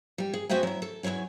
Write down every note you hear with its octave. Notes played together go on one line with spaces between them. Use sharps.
G3 G5
G#4
B3 F#4 C5 E5 G5 G#5
F#3 E4
A4
E2 F#3 E4 C#5 G#5